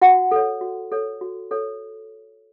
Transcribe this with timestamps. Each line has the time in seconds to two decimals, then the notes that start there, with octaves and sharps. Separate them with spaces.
0.01 F#4 F#5
0.31 A4 C#5
0.61 F#4
0.92 A4 C#5
1.21 F#4
1.51 A4 C#5